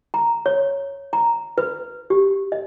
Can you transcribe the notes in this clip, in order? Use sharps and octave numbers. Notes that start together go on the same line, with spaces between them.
A#5
C#5
A#5
B4
G4
D#5